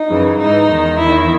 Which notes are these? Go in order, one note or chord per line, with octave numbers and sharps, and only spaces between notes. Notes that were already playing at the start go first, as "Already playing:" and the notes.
Already playing: D#4
F#2 C#3 E3
G#2 E3 D#4
E2 D#3
E2 D#3 E4